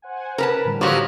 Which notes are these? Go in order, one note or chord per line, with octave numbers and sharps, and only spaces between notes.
C5 F#5 G#5
A#4 B4 A5
A2 D3 G3
F3 F#3 F#4 G4